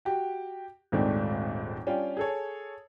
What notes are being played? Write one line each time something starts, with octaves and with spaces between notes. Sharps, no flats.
F#4 G4
D#1 G#1 G#2 A3 C4 D4
G3 C#4 D4 F4 G5
G#4 A4 C#5